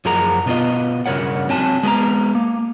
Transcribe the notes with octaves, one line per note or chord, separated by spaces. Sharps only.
F#2 F3 G#4 A#4 F#5 A#5
B2 B3 D4 F4 D#5
G2 C#3 A#4 C#5 F#5
F#3 C4 G#5 A5
G#3 B3 G#5 A#5
A#3